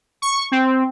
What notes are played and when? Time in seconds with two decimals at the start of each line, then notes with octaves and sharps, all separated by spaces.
0.22 C#6
0.52 C4